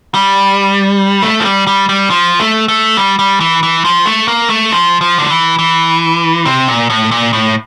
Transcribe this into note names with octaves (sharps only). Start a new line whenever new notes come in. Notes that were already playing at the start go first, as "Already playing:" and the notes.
G3
A3
F3
G3
G3
G3
F3
A3
A3
G3
G3
E3
E3
F3
A3
A#3
A3
F3
F3
D3
E3
E3
C3
A#2
A2
A#2
A2